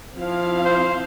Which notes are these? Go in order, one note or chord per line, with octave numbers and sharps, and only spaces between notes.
F3 C4 E4 F5
C5